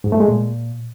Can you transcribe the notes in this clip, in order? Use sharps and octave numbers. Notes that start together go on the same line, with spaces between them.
G#2
A3
G#3
A#2